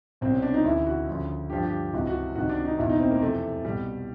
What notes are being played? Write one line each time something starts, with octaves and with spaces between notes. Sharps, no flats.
C2 B2 C4
C#4
D4
D#4
D2 C#3 E3 E4
F#4
D2 C#3 F3
G2 D3 F3 G4
G4
C#2 C3 E3 F#4
F#4
C#2 C3 D#3 F#4
D4
D#4
E2 B2 E4
D#4
C4
A#3
F2 C3 E3 A3
C2 B2 G3